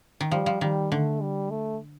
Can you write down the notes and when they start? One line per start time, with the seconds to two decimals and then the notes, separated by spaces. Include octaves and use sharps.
0.20 D#3
0.31 F3 G3
0.46 F3
0.61 D#3 G3
0.92 D3 A3
1.22 G3
1.50 A3